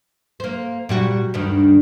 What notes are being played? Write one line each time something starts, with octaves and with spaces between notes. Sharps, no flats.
A#3 C5
A#2 G3 F#4
D2 G2 D#3